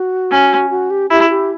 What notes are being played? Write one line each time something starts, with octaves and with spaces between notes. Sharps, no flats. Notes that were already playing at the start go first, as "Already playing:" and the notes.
Already playing: F#4
C#4
F#4
G4
E4 G4
G4